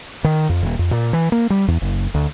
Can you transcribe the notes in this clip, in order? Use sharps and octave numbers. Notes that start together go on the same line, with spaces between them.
D#3
F2
D#1
F2
A#2
E3
A#3
G3
E2
F#1
D2